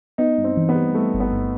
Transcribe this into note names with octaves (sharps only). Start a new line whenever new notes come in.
B3 D#4
G2
C4
E3
B3
G3
G3 A3
G1
B3
G2